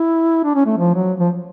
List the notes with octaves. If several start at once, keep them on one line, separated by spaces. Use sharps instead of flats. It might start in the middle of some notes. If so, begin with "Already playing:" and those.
Already playing: E4
D4
C#4
A3
F3
F#3
F3